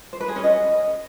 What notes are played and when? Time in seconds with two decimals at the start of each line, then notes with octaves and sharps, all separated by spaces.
0.13 C5
0.21 B4
0.28 G#4
0.36 C#4
0.44 D#5